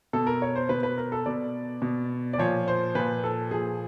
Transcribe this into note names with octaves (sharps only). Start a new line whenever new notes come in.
B2 A4
A#4
C#5
C5
B2 B4
B4
A#4
A4
B2 D5
B2
D5
A#2 F3 C#5
C5
A#2 F3 B4
A4
A#2 F3 G#4